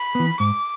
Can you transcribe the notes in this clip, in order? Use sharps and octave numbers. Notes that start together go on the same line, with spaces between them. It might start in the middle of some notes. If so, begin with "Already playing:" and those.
Already playing: B5
E3 B3
G#2 D6